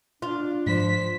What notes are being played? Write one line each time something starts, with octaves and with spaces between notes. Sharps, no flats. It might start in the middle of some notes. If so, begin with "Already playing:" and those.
D4 F4
G#2 F3 C5 B6